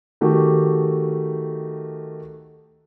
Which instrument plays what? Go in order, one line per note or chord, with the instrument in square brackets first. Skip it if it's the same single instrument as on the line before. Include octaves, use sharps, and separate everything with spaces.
[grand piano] D#3 A3 F#4 G4